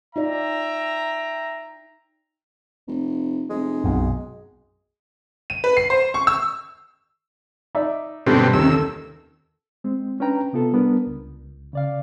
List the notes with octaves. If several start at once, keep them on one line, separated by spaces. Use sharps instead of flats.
D#4 F4 D5 E5 G5 A#5
F1
F1 G#3
B1 F#2
D#7
B4
C7
C5
C#6
E6
D#4 D5 E5
G2 B2 D3 G3 C4 C#4
D#2 C3 C#4 E6
A4
G#3 C4
C#4 D4 B4 G5 A#5
C3 B3 F4 A4
G3 B3 D4 A#4
C#2
C#3 D5 F5